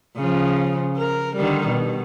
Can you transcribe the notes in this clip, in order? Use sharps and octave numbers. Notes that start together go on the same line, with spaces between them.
C#3 F3
A#4
D3 D#3 G3
B2